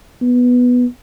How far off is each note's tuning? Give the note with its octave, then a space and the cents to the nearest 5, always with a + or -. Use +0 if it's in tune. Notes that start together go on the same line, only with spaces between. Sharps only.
B3 -5